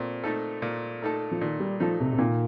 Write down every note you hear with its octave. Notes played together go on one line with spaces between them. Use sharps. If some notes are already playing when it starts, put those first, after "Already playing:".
Already playing: A#2 A3 C4
A3 D#4 A4
A#2
A3 D#4 A4
F3
A#2 D#3
G3
F3 A3 D#4 A4
C3
C3
A#2 D#3